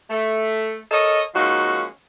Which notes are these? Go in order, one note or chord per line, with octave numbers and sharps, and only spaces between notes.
A3
A4 A#4 C#5 D#5
F3 G#3 A#3 C#4 D#4 F#4